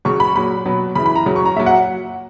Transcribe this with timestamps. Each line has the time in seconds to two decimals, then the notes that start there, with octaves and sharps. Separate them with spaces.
0.05 C#3 F#3 C#6
0.20 B5
0.35 A#2 F#3 B5
0.66 B2 F#3
0.95 C#3 E3 B5
1.06 B5
1.16 A#5
1.26 C#3 F#3
1.36 C#6
1.46 A#5
1.56 A#2 F#3 E5
1.66 F#5